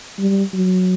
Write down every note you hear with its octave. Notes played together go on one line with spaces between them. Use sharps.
G3
F#3